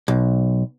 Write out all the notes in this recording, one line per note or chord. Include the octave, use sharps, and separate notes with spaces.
B1